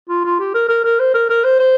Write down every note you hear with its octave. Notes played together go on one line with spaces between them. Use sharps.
F4
F4
G4
A#4
A#4
A#4
C5
A#4
A#4
C5
C5